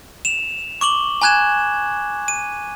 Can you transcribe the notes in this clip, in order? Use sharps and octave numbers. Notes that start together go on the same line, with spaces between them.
E7 F7
C#6 D6 F#7 G7
G#5 A#5 F#6 G#6 E7
D#7